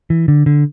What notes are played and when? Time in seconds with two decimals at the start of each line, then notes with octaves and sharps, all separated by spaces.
0.10 E3
0.28 D3
0.46 D3